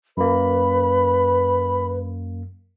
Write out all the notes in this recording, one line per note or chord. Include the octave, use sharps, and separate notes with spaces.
F#2 A#3 B4 B5